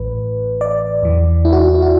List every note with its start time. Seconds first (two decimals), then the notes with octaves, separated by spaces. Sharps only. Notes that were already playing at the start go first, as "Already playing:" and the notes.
Already playing: A1 A2 E3 B4
0.61 D5
1.03 E2 E3
1.45 E4
1.52 F#4
1.59 E4
1.68 F#4
1.75 E4
1.82 F#4